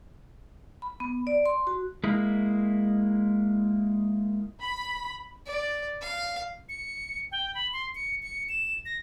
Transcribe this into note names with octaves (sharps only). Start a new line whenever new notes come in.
B5
B3
D5
C6
F#4
G#3 A#3 E4
B5
D5
F5
C#7
G5
B5
C6
C#7
C#7
E7
A#6